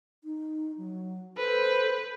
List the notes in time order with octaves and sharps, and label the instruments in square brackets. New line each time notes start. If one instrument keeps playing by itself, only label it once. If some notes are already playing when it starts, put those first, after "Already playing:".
[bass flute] D#4
F#3
[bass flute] A4 [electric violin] B4 [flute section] C5